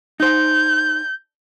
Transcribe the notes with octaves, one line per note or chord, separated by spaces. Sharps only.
D#4 C5 G6